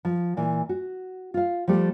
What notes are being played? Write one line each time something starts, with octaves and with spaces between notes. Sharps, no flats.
F3
A#2 E3
F#4
F4 F5
F3 G3 A3 G4